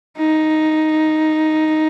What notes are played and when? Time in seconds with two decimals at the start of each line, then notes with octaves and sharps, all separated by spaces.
0.18 D#4